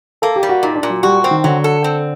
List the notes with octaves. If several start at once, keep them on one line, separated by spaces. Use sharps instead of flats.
A#3 A4
G4
G3
F#4
A#2 D#4
D4
A#2
F#3
G3 F#4
C4
D#3
D3 F#3
A4
C4